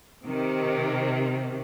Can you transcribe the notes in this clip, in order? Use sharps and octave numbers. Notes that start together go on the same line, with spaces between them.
C3 D#3